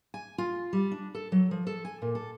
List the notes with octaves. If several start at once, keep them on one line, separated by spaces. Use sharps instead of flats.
G#5
F4
G3
D4
A4
F#3
F3
A4
G#5
A#2
A4